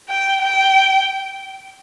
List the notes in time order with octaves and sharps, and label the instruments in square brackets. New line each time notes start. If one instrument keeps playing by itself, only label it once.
[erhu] G5
G5